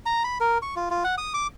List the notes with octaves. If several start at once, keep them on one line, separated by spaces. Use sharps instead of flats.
A#5
B5
A#4
C#6
F4
F4
F#5
D#6
D6